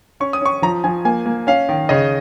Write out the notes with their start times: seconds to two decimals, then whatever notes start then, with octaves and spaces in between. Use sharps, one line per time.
0.20 C#4 C#6
0.33 D#6
0.41 C#4 C#6
0.62 F3 A#5
0.84 F3 G#5
1.05 A#3 G#5
1.26 A#3
1.47 C#4 F5
1.69 D#3
1.89 C#3 D#5